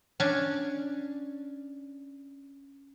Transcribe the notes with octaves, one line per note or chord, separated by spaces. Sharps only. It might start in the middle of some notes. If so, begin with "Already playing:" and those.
C#4 D4